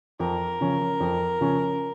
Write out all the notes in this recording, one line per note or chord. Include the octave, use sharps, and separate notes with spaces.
F2 A#4
C#3 F3 C#4
F2
C#3 F3 C#4